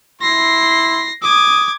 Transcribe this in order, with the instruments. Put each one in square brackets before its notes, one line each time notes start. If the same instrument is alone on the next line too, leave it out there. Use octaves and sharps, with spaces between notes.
[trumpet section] E4 C6 [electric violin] A#6 C7
[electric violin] D6 G#6 [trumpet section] D#6